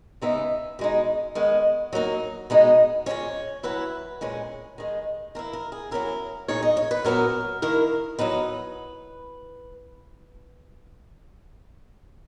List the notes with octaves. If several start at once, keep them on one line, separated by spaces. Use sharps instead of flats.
C#3 G#3 B3 D#4 E5
B2 G#3 D#4
D#3 G#3 B3
F#3 A#3 D#4
B2 G#3 B3 D#4
A#2 G#3 C#4 C#5
F#3 C#4 E4 B4
A#2 G#3 C#4
D#3 G#3 D#4
E3 A#3 E4 A#4
A#4
G#4
F#3 C#4 E4 A#4
A#2 G#3 D#4 C#5
D#5
C#5
B4
A#2 F#3 B3 E4 A#4
D#3 A#3 E4 A#4
F#3 B3 D#4 B4